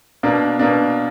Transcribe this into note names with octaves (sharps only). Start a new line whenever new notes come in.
B2 A#3 D4
B2 A#3 D4